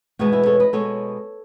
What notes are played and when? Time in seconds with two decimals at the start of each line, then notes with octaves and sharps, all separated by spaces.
0.19 E2 B2 G#3 B3 D#4 F#4
0.32 E4 G#4
0.46 A4 C#5
0.60 B4 D#5
0.73 B2 G#3 B3 A4 C#5